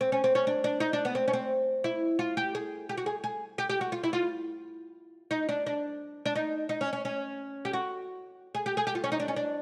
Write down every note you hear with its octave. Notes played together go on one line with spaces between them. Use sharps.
C4
C#4
C4
C#4
D4
D4
D#4
D4
B3
C4
C#4
C4
E4
F4
G4
G#4
G4
F#4
G#4
G#4
G4
G4
F#4
F4
E4
F4
D#4
D4
D4
D4
D#4
D#4
C#4
C#4
C#4
G4
F#4
G#4
G4
G#4
G4
F4
C#4
D#4
D4
C#4
D4